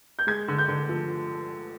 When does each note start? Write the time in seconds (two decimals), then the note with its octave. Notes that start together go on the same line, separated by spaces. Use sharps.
0.19 G6
0.27 G#3 G#6
0.48 D3
0.58 G6
0.68 D3
0.89 F3